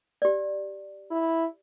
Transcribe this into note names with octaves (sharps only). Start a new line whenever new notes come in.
G4 D5
E4